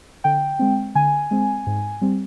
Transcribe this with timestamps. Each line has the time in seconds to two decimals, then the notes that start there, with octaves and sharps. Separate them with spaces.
0.24 D3 G5
0.59 G#3 C4
0.95 D3 G#5
1.31 G#3 C4
1.67 G#2
2.01 G3 C4